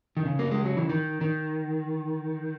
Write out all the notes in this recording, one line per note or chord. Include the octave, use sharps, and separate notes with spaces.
D#3
C#3
A#3
G#3
F#3
E3
D#3
D#3